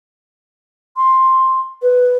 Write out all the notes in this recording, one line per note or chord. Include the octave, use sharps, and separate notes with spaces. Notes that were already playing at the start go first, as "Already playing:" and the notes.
C6
B4